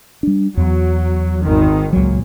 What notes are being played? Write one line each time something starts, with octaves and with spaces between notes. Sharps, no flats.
G3 D4
E2 F#3
G#1 D#3
C#2 A#2 F#3